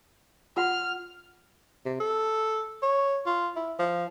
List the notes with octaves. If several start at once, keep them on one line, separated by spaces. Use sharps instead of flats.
F4 F#5 C6 F6
C3
A4
C#5
F4
E4
F3